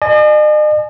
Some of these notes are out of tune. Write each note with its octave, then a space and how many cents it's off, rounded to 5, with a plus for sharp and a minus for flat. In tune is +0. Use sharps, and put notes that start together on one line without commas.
D#5 -45 G#5 +30